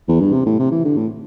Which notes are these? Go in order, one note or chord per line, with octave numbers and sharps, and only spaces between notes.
E2
G2
C3
A2
C3
E3
D3
A2